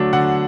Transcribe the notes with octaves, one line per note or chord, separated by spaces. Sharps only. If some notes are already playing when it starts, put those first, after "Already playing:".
Already playing: D3 F#3 A3 D4
D3 F#5